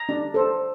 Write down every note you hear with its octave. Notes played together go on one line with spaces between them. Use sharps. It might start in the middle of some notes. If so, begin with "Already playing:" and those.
Already playing: A#5
D4
A4 C5